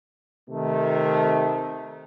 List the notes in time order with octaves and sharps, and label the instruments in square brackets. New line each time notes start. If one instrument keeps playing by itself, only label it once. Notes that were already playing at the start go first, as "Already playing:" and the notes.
[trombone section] C3 D#3 A3